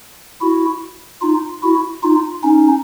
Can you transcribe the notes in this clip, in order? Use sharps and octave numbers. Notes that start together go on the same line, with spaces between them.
E4 F#4
D#4 F4
E4 F#4
D#4 F4
C#4 D#4